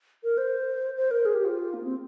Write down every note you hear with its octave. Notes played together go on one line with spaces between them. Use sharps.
A#4
C5
C5
A#4
G#4
G4
F4
A#3
C4